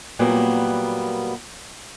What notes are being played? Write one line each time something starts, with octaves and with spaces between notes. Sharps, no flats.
A#2 F#3 G3 A#3 B3